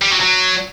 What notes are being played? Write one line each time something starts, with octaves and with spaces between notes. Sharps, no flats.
G3
F#3
F#3